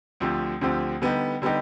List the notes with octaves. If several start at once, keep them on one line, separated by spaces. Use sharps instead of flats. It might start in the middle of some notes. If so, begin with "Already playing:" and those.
D2 D3 F3 C4 G4
D2 D3 F3 C4 G4
D3 G3 B3 D#4 G4
D3 G3 B3 D#4 G4